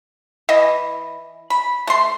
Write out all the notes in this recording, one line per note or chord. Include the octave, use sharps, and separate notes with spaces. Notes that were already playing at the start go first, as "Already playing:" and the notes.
E3 D#5
B5
A3 C6